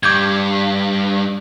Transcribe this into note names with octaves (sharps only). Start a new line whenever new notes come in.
G2 D6 G6 G#6